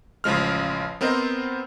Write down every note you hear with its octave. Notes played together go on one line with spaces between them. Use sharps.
A1 C#3 F3 G#3 F6
B3 C4 A#4 C5 D#5